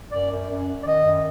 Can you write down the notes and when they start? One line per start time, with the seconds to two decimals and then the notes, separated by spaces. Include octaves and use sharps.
0.12 F#2 D5
0.30 F#2
0.49 F#2
0.67 F#2
0.81 D5
0.86 D#3 D#5
1.04 F#2